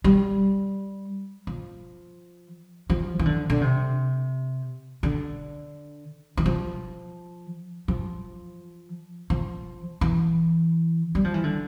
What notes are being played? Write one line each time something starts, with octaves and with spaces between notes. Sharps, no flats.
G3
F3
F3
E3
D3
D3
C3
D3
E3
F3
F3
F3
E3
G3
F3
E3
D3